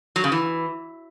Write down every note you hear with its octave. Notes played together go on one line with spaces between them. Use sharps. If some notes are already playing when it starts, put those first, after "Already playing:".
F#3
C#3
E3